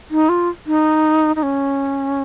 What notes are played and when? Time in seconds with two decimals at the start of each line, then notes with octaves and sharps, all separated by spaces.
0.11 D#4
0.29 F4
0.67 D#4
1.36 D#4
1.43 C#4